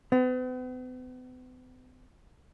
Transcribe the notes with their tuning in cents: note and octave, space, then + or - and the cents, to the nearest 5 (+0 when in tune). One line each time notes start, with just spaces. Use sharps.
B3 +45